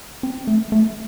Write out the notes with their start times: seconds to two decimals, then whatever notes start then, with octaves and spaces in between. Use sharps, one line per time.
0.23 C4
0.47 A3
0.72 A3